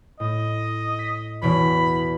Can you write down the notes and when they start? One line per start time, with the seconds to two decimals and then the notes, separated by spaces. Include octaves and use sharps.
0.20 A2 D#5
0.99 B6
1.42 E2 B2 E3 B5